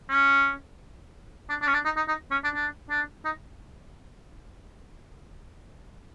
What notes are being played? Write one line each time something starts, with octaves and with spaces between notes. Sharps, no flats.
C#4
D4
D4
C#4
D4
D#4
D#4
D#4
C#4
D4
D4
D4
D#4